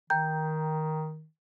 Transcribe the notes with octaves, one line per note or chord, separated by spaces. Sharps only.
D#3 G5 A#5 G6